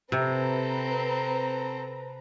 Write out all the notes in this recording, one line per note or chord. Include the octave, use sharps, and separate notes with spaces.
C3 C4 A4 B4 A#5